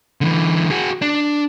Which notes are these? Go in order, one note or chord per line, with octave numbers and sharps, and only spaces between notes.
D3 E3
F#4 G#4
D4